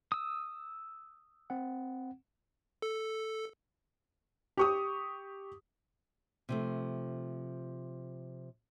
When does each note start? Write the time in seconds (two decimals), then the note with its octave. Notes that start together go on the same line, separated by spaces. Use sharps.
0.12 D#6 E6
1.50 C4 F#5
2.82 A4
4.57 G4 C#6 D#6
6.49 C3 F3 A3